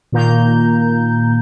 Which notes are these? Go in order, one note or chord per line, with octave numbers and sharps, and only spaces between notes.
A#2 D#3 A#3 A#5 G6